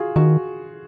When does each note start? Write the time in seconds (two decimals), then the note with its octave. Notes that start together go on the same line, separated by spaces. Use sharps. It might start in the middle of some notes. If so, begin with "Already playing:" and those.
Already playing: F4 F#4 G#4
0.16 D#3 F#4